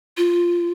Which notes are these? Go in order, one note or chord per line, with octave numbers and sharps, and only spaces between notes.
F4